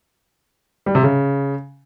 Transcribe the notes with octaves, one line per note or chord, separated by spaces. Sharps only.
G3
C3
C#3